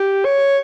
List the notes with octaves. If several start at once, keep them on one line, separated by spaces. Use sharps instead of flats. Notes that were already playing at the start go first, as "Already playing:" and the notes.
Already playing: G4
C#5